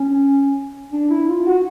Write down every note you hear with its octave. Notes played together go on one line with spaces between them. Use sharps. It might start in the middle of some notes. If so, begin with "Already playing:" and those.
Already playing: C#4
D4
E4
F4
F#4